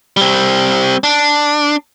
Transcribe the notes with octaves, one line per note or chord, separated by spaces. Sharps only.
G3 C4
D4